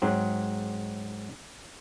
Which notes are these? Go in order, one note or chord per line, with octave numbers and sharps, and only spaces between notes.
G#2 F#3 C4